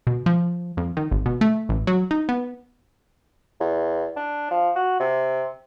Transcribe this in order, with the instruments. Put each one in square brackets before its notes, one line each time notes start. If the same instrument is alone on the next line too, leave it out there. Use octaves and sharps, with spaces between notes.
[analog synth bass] B2
F3
F2
D#3
G#1
B2
A3
A1
F#3
D#4
B3
[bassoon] E2
D4
F3
F#4
C3